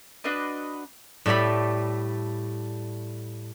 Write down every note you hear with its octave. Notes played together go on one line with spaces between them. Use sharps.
D4 F#4 B4 D#5
A2 G3 A3 D5 B5